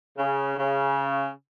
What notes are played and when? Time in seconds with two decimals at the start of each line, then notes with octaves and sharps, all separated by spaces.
0.18 C#3
0.57 C#3